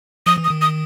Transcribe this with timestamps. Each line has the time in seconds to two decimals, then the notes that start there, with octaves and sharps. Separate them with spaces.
0.26 F3 D#6
0.38 E3
0.44 D#6
0.50 D#3
0.62 D#6